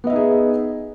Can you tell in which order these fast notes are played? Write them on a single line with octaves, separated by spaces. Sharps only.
B3 D#5 E5 D#4 G#4